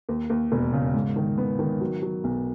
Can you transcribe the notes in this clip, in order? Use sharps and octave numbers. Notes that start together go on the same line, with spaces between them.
D#2
D#2
E1
C#3
G#2
D#3
B3
D#3
F#3
F#3
B1